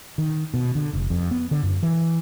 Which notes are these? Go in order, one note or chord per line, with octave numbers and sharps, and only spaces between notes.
D#3
B2
D3
F1
F2
B3
D3
F#2
E3